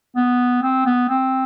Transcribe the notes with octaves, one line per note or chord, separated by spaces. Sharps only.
B3
C4
B3
C4